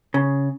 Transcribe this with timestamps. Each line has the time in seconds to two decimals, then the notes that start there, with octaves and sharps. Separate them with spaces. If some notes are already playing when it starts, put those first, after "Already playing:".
0.14 C#3